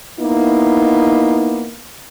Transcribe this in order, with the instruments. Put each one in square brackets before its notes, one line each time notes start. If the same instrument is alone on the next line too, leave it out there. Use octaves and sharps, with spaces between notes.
[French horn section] A#3 B3 D#4 E4